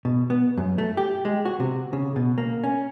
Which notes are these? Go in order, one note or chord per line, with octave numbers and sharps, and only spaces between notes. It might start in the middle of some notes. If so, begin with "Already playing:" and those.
B2
B3
F#2
A3
G4
G#3
F#4
C3
C#3
B2
A#3
C#4